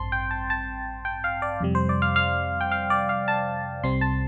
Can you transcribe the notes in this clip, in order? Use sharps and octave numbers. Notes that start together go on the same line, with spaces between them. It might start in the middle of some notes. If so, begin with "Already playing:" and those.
Already playing: A1 G2 C4 A5 C6
G5
A5
A5
G5
F5
D5
F2 C3 G3
C5
D5
F5
F5
G5
F5
D5
F5
A5
C2 C3 G3 C4 C6
A5